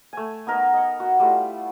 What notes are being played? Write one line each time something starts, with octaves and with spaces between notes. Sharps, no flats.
A3 G#5
B3 D#4 A#4
D#5 C#6
F#4
G3 A3 E4 F4